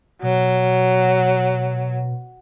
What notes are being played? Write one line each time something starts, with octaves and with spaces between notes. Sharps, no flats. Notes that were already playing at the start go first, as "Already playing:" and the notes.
B2 F#3